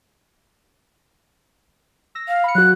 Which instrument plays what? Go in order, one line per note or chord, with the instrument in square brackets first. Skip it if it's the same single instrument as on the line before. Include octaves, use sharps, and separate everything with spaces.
[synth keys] E6 A#6
[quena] F5
[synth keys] B5 C#7
[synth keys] F#3 F#4 [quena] F#6